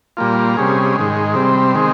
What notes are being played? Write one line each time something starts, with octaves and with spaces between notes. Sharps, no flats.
A#2 G3 A#3 F4
C3 G3 C#4 G#4
G#2 D#3 G#3
C3 G3 C4
D#3 G#3 C4